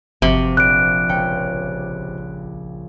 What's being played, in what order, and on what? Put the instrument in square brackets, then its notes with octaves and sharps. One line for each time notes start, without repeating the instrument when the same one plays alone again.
[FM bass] G1 [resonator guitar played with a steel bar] C3 [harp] F3 F#4
[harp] A#1 [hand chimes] F#6 D7
[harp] C#2 G5 C#7